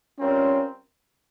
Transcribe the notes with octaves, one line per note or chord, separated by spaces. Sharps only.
G3 C4 C#4 F4 A#4